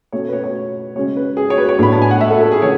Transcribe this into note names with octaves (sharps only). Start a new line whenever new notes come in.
B2 A3 C#4 C#5
B4
C#5
C#5
C#3 G#3 C#4 C#5
B4
G#4
C#5
B4
C#5
A2 F#3 B3 D4 B5
A5
G#5
F#5
E5
A4
A4
G#4
C#3 E3 C#5